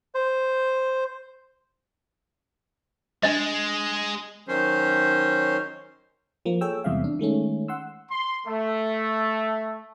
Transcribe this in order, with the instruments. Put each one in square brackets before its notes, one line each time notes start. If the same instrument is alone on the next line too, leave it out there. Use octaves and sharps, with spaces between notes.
[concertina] C5
[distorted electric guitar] G#3 [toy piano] D4 D#5
[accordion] D#3 F#3 C#4 C5
[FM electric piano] F3 A#3
G#4 A4 C#5 G5 E6
E2 C3 G3 G#3 E5 F5
D4
D#3 G#3 A3 C#4
F#5 C6 E6
[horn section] C6
A3